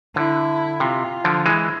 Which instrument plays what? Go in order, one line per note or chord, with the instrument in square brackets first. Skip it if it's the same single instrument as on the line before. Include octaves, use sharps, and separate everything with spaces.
[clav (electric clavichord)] D3 [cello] E4
[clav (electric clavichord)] C3 [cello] F4
[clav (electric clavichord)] D3 F3
[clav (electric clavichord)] E3 G#3 [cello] E4